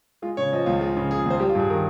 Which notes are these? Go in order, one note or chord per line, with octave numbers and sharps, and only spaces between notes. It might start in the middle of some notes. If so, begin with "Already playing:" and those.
G#3 F4
C#3 C#5
F3 D#5
C#2 F4
G#3 F4
C#3
F3 G#4
C#2 C5
G3 G4
F4
G2 G#4
D#3 A#4